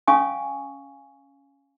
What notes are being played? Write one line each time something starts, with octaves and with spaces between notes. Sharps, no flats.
C#4 F5 G#5 C#6 D#6